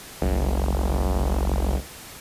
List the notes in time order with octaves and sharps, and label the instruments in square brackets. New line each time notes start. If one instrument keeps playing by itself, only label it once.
[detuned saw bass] F#1 [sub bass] C2